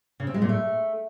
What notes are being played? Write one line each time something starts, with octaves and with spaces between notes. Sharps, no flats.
C#3
C4
G#3
A#2
A3